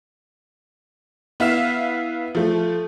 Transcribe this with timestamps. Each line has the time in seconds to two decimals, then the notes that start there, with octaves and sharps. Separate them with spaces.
1.40 B3 E4 E5 F5 F6 E7
2.35 F3 A3